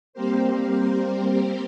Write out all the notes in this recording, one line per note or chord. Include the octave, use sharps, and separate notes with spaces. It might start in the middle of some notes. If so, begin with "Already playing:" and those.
G3 A#3 C4 G4 A#4 C5